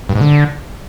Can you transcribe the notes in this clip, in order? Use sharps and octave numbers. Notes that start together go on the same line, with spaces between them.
G2
G#2
D3